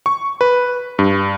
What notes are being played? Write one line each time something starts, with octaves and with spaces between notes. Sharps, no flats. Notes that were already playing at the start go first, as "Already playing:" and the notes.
C#6
B4
G2